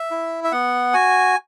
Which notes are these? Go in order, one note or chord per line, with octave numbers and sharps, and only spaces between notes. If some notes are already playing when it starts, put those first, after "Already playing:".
Already playing: E5
E4
E5
B3 F#5
F#4 G#5